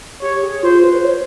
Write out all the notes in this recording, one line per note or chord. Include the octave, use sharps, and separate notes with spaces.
G4 C#5
G#4
F4 C5
B4
C5
C#5